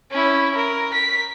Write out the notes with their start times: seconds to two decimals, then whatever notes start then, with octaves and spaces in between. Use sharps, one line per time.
0.11 C#4 E4
0.56 A#4
0.93 B6